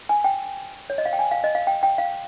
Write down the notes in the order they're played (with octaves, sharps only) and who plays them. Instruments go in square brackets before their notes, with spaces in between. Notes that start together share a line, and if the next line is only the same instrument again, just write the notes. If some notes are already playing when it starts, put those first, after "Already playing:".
[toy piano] G#5
G5
C#5
D#5
F5
G5
G#5
F5
D#5
F5
G5
G5
F5